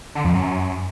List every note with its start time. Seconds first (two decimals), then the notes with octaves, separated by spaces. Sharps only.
0.15 D3
0.25 F2
0.34 F#2